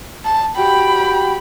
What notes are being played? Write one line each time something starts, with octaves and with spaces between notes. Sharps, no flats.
A5
F#4 G4 G5 B5